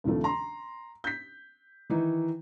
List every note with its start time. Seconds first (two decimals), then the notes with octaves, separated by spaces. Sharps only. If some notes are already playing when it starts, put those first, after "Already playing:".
0.04 D2 C3 D#3 F3 A3
0.24 A#5 C6
1.04 G6 B6
1.90 D#3 E3 D#4